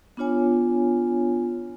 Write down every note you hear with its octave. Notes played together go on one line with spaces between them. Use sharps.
B3 D4 F4 C#5 G#5